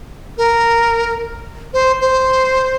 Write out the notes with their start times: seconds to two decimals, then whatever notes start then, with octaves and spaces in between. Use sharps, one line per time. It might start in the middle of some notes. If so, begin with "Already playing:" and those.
0.38 A#4
1.73 C5
2.01 C5